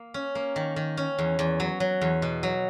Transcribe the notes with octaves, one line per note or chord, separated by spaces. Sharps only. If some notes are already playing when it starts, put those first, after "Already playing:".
Already playing: A#3
C#4
A#3
D#3
D#3
C#4
E2
E2
F#3
F#3
E2
B2
F#3